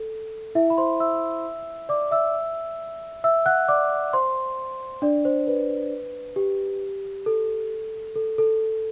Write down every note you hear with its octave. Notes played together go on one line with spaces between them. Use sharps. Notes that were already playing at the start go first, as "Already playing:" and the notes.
Already playing: A4
E4 E5
B5
C5 C6
E5 E6
D5 D6
E5 E6
E5 E6
F#5 F#6
D5 D6
C5 C6
D4 D5
C5
B4
G4
A4
A4
A4